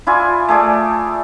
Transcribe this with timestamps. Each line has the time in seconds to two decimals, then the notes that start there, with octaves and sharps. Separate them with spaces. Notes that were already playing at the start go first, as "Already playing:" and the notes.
0.07 E4 F4 D5 G#5
0.49 A3 G#4 D5